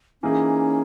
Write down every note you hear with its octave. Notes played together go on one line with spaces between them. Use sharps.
E3 A#3 C#4 D#4 G#4